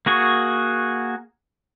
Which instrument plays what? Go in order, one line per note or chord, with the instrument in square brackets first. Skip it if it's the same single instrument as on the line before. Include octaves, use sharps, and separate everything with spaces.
[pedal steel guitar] A#3 F#4 G#4 C#6